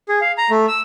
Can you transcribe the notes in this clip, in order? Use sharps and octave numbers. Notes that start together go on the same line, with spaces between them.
G#4
F5
A#5
A3
E6